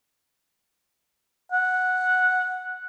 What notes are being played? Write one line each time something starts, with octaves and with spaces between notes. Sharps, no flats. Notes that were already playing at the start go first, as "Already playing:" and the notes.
F#5